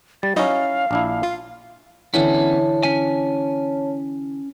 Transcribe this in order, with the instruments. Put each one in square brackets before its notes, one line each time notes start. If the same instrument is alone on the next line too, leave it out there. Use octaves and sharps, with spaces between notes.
[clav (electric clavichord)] G3 [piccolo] A6
[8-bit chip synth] F#3 D#4 D#5 [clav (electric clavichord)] C#4 E4 [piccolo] F5
[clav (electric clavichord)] A#1 D4 E4
[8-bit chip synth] F4
[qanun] D3 E3 E4 [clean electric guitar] B3 C#4 [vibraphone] C#5 A5
[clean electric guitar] C#4 G#5